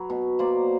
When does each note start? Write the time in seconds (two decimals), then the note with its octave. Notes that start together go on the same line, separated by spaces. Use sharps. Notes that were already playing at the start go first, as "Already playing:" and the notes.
Already playing: F#3 B4
0.10 B2
0.39 A#3 C5 D5